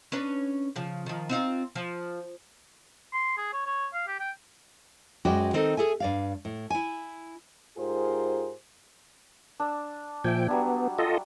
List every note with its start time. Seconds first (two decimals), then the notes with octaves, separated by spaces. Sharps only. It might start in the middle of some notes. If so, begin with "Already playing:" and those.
0.12 C#4 D4 B4
0.76 C#3 F3
1.06 D#3 F3
1.29 C4 D#4 F4
1.75 F3
3.13 C6
3.38 G#4
3.53 C#5
3.66 C#5
3.94 F5
4.07 G4
4.20 G5
5.25 F#2 G#3 F#4 B4 D5 G5
5.53 D#3 C4 D#4 A4
5.77 G#4 A4 E5 G#5
6.00 G2 D5 F5
6.45 A2
6.70 E4 G#5
7.78 G#2 F4 G4 G#4 A#4 C5
9.60 D4 E6
10.24 A#2 F3 E5 G5 G#5
10.48 F#3 G3 B3 D4
10.99 F4 A4 D#5